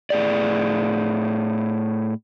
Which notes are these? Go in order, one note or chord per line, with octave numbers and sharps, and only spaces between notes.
A2 G#4 D5